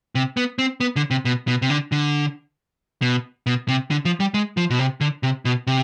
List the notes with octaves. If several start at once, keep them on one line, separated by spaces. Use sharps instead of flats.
C3
B3
C4
B3
D3
C3
B2
B2
C3
D3
D3
B2
B2
C3
D3
F3
G3
G#3
F3
B2
C3
D3
C3
B2
C3